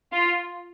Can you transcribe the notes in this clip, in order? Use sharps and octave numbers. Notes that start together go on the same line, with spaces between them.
F4